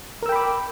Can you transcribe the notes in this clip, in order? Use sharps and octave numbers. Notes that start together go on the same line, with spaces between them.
A#4 G5 B5 D6 E6